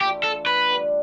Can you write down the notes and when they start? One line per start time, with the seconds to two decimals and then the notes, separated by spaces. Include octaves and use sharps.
0.01 E3 A3 D4 F4 G4
0.24 A4
0.46 B4
0.70 D3 G3 D4